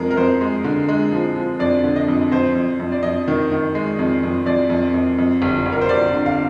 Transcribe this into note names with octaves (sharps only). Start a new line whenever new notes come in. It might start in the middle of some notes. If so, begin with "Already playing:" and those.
Already playing: F2 G#3 A#4
A#4
F2 C5
G#3
D3
G#3
F3
F3
F2 D5
D3
D#5
F2
F2 C5
F2
F2
D5
F2 D#5
D#3
D#3
G#3
F2
F2
F2 D5
F2
F2
F2
G1
G1
A#4
C5
G1 D5
D3
F5